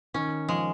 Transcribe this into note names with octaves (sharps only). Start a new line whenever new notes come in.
D#3 C#4
F3 G#3